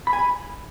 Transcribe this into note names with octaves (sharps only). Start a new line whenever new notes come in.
B5
G#5
B5